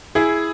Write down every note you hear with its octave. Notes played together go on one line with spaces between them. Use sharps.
E4 G#4